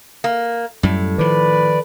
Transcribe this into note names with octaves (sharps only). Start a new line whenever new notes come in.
A#3
F#2 A2 G3
D#3 F3 B4 D5